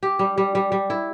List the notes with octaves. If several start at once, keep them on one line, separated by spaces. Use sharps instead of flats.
G4
G3
G3
G3
G3
E4